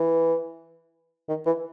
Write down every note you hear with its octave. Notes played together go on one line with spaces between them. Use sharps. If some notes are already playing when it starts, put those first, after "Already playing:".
Already playing: E3
D#3
E3